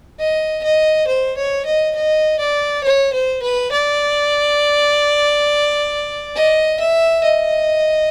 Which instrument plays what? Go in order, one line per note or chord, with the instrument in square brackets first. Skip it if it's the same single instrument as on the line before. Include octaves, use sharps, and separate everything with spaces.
[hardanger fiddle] D#5
D#5
C5
C#5
D#5
D#5
D5
C#5
C5
B4
D5
D#5
E5
D#5